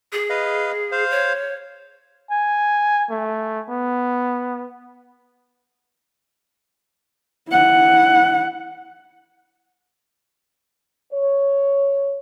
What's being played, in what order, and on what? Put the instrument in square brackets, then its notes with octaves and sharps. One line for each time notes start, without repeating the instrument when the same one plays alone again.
[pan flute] G#4
[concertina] B4 D#5 F5
C5 F5
[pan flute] C#5
[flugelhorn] G#5
A3
B3
[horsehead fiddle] E4 F#5
[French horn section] C#5